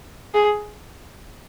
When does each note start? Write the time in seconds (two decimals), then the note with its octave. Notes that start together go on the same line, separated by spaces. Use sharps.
0.34 G#4